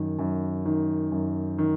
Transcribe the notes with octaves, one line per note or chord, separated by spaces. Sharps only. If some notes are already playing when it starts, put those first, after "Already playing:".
Already playing: F#2 D#3
F#2
D#3
F#2
D#3